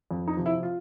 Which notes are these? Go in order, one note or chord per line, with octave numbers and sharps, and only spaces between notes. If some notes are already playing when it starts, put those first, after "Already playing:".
F2
D#4
C3 F3
E4
F4